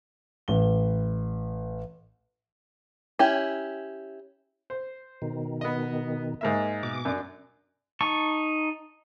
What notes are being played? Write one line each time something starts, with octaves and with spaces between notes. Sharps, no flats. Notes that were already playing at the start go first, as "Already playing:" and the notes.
A1 G7
C#4 E4 G4
C5
B2 D#3
B3 D#5
G#2 A#3 E5
B2 D6
F#2 D4
D#4 A5 C#6